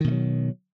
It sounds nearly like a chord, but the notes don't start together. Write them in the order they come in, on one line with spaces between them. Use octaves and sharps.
D#3 B2 A3 F#3